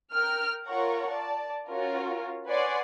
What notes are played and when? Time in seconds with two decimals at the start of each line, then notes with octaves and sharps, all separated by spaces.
0.14 A#4 G5 F6
0.68 F4 A#4 C#5 F#5 A#5 C#6
1.11 D5 A5
1.68 C#4 F4 F#4 A#4 C#5
2.50 B4 C#5 D5 F#5 G#5 C6